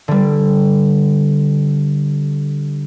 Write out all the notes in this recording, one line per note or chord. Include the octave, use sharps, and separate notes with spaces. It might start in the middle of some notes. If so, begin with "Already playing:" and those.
D3 G3